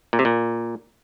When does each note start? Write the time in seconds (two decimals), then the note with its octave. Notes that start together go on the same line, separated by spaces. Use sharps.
0.13 A#2
0.19 C3
0.25 A#2